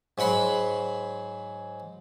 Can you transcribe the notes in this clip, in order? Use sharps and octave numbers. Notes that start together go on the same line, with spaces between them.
G#2 F#3 F#5 B5 C6